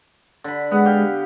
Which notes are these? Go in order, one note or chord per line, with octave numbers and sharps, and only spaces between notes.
D3 B5
G#3 B3 F#5
G4 F5 G5